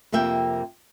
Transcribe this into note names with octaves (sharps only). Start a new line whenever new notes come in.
F2 C3 A#3 E5 G5